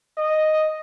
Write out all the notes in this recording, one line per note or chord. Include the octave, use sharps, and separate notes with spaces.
D#5